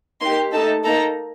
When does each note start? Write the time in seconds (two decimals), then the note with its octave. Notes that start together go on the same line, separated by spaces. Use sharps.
0.21 A#3 D#4 G4 C6
0.52 A3 D#4 A4 A5
0.84 A#3 D#4 A4 A#5